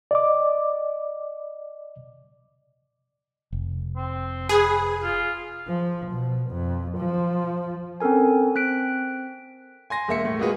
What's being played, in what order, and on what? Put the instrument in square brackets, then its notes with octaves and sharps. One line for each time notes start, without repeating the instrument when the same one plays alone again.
[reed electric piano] D5 D#5 D6
[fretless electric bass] F1
[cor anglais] C4
[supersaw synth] G#4 [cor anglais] B4
[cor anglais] F4
[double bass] F3
B2
F2
F3
[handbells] C4 C#4 A4 A#4 G#5
C4 F#6 B6 D7
[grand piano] G#5 C6 A#6
E1 A#3 E5 C#7
A2
G#3 A#3 F4 F#4 G#4 B4